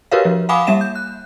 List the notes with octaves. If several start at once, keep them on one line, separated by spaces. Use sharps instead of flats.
F#4 G4 A#4 B4 C#5 F5
F3
F5 F#5 G#5 B5 D6 D#6
G3 A#3 E5 E7
G6
F#6